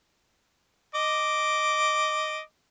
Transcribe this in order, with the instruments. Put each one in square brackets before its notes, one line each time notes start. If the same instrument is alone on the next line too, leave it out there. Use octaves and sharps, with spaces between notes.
[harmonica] D#5 D6